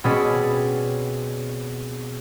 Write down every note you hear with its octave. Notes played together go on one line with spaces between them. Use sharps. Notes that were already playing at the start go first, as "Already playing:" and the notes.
B2 C4 C#4 G#4 D5 B6